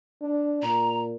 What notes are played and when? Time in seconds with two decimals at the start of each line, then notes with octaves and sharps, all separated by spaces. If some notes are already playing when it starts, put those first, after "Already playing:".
0.22 D4
0.63 A#2 A#5